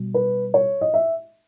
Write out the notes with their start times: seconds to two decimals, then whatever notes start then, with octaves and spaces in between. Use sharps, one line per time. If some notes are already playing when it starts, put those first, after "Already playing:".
Already playing: B2 G3
0.14 B4
0.54 C#5
0.81 D#5
0.94 E5